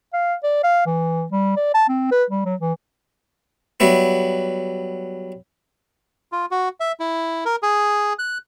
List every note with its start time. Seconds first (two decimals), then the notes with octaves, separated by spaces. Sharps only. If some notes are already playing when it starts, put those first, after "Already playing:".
0.13 F5
0.43 D5
0.64 F5
0.86 E3
1.31 G3
1.56 D5
1.74 A5
1.89 C4
2.11 B4
2.30 G3
2.45 F#3
2.61 E3
3.80 F#3 G3 B3 E4
6.32 F4
6.51 F#4
6.80 E5
7.00 E4
7.45 A#4
7.63 G#4
8.19 F#6